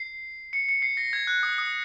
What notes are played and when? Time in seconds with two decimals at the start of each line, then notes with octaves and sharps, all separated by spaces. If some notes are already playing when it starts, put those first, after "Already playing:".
Already playing: C7
0.53 C#7
0.69 C#7
0.82 C7
0.97 A#6
1.13 G#6
1.27 F#6
1.43 D#6
1.58 D#6